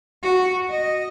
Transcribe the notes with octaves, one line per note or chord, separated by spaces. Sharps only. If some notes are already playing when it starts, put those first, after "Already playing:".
F#4
D#5